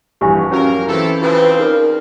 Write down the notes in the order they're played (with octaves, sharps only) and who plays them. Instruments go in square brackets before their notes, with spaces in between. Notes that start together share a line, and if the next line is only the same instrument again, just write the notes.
[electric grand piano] A#1 G2 E3 [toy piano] G4 E5 G#5
[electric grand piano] F#3 [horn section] A#3 A#4 [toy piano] C#4 F4
[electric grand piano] E3 E4 [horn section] A3 C4 A4
[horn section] C#3 F3 C4 [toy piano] F4 G#4 B5 [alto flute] B4
[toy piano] D#4 G#4 D5 [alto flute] A#4